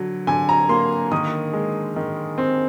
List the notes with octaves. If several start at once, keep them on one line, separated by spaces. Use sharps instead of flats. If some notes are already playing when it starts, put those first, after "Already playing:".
Already playing: D3 F#3
D3 G#5
A#5
A#3 C6
D#3 D#6
G#3
D#3
C4